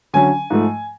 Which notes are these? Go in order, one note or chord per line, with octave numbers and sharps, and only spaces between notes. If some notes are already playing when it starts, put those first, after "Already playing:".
D3 F#3 C#4 G#5
G#2 F3 A3